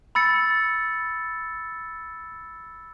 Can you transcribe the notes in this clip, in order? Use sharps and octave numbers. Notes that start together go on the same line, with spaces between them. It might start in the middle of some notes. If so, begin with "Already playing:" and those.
B5 E6 A6 C#7